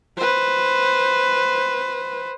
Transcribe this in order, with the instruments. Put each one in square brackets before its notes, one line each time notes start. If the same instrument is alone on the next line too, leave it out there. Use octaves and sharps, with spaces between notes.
[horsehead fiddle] B4 C5